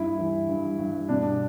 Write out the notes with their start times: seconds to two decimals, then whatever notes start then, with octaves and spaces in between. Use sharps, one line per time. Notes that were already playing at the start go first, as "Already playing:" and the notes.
Already playing: G2 E4
0.18 E3
0.49 G2
0.79 G2
1.09 B2 D4